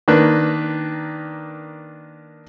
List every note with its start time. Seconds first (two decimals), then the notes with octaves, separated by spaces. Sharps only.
0.08 D#3 A#3 D4 B4